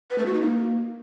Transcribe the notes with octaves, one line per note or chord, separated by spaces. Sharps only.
B4
A3
F#4
D#4
A#3